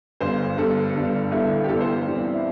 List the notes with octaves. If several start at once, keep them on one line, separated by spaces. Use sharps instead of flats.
G1 G2 D3 C5
G1 G2 D3 A4
G1 G2 D3
G1 G2 D3 E4
G4
G1 G2 E3 A4
C5
G4
G1 G2 E3 D4
C4
E4